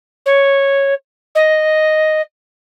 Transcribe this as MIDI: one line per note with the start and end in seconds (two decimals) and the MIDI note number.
0.26 0.94 73
1.35 2.22 75